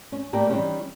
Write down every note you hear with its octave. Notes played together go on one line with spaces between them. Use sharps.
C#4
A2 A#3 G4 A#4 D5
D#3 E3 F#3 G3 A3 C#4